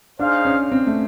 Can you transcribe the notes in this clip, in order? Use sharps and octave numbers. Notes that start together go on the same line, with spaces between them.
D4 D#4 G#4 C5 F5
C#4
C4
A3